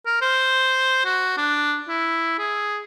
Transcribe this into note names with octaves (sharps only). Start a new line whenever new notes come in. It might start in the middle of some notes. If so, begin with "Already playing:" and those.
A#4
C5
F#4
D4
E4
G#4